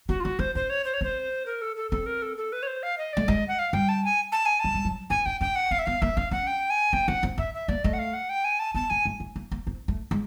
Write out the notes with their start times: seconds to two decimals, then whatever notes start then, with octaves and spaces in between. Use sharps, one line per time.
0.09 C#4 F#4
0.20 F4
0.24 C#4 F#4
0.39 D4 C5
0.55 C#4 C5
0.70 C#5
0.85 C5
0.94 C#5
1.01 C4 C5
1.46 A#4
1.61 A4
1.76 A4
1.91 C4 A4
2.06 A#4
2.22 A4
2.37 A4
2.52 B4
2.63 C#5
2.67 C5
2.83 F5
2.98 D#5
3.13 A3 D5
3.28 G#3 D#5
3.48 F#5
3.59 F5
3.73 G3 G5
3.89 A5
4.04 G#5
4.32 A5
4.46 G#5
4.60 F#3 A5
4.74 G3
4.85 F#3
5.10 C4 G#5
5.26 C#4 G5
5.41 C#4 G5
5.56 F#5
5.71 C4 F5
5.79 E5
5.86 B3 F5
6.02 A#3 E5
6.17 C#4 F5
6.31 C#4 F#5
6.47 G5
6.70 G#5
6.93 C4 G5
7.08 C4 F#5
7.23 C4
7.38 C#4 E5
7.54 E5
7.68 A#3 D5
7.84 A3 D#5
7.93 F#5
7.99 F5
8.14 F#5
8.29 G5
8.44 G#5
8.59 A5
8.74 B3 A5
8.90 A#3 G#5
9.05 A3
9.20 A3
9.36 A#3
9.51 A#3
9.67 C4
9.88 A3
10.11 G#3